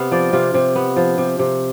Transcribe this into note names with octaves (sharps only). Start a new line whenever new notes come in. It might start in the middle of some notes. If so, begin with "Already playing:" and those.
Already playing: C3 B3 F5
F3 D5
C3 F4
C3
B3
F3
C3
C3